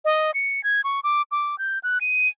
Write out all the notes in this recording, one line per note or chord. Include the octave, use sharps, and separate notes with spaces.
D#5
C#7
G#6
C#6
D6
D6
G6
F#6
D#7